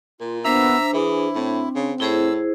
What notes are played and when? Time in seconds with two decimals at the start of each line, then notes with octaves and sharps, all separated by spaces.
0.20 A#2 F4
0.45 B3 D4 C5 E5 A#5 E6
0.93 E3 E4 G#4
1.35 A2 C4
1.75 C#3
2.00 A2 E4 G#4 C5 E6